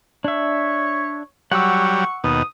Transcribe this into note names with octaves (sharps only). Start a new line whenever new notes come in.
D4 C#5 E5
F#3 G3 F#5 C#6 E6
D#2 B2 D#6